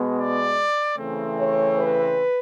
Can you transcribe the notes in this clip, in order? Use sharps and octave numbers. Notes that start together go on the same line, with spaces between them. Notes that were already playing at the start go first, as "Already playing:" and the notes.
Already playing: B2 G#3 B3
D5
C#3 E3 A3 C4
C#5
B4